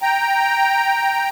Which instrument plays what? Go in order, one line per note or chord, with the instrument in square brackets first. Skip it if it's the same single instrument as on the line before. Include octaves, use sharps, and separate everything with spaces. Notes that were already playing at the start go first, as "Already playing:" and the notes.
[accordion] G5 A#5